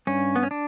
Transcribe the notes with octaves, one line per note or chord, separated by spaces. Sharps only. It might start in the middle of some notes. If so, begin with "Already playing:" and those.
G2 C#4
B3
C#4
D4